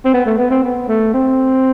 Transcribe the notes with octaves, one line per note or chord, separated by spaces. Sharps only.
C4
B3
A3
B3
C4
B3
A3
C4